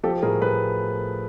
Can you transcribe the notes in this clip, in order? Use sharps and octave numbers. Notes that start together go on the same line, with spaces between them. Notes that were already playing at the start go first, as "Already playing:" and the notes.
F3 G4 A4
A2 G#4 A#4
A2 A4 B4